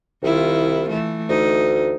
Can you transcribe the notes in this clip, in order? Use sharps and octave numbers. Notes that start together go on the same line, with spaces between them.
C2 D#3 E4 F4
E3 A3
D2 D#4